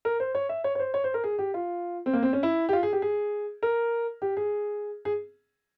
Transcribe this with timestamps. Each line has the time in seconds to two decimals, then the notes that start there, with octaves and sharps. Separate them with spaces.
0.05 A#4
0.20 C5
0.35 C#5
0.49 E5
0.64 C#5
0.75 C#5
0.79 C5
0.94 C#5
1.04 C5
1.14 A#4
1.24 G#4
1.39 G4
1.54 F4
2.06 C4
2.13 A#3
2.23 C4
2.33 C#4
2.43 E4
2.69 G4
2.73 F4
2.83 G#4
2.93 G4
3.02 G#4
3.63 A#4
4.22 G4
4.37 G#4
5.05 G#4